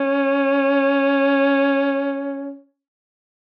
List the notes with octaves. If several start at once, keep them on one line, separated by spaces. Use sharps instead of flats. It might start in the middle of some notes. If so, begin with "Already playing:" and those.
Already playing: C#4